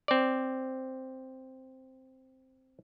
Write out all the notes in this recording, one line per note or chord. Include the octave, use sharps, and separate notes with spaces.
C4 D5